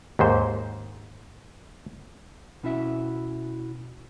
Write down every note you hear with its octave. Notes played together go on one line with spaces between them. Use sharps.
D#2 G#2 C5
B2 C#4 E4 F#4 E5